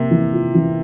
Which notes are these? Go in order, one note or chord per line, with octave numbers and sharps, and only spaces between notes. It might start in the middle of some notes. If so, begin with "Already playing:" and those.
Already playing: C3 A#3
E3
F4
E3